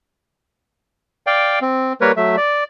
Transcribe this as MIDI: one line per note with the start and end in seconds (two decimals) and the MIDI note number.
1.27 1.59 74
1.27 1.59 77
1.27 1.59 79
1.62 1.93 60
2.01 2.12 55
2.01 2.12 58
2.01 2.12 70
2.01 2.12 71
2.01 2.12 73
2.17 2.36 54
2.17 2.36 57
2.17 2.36 76
2.37 2.64 74